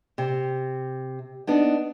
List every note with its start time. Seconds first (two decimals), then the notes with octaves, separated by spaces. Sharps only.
0.18 C3
1.47 B3 D4 D#4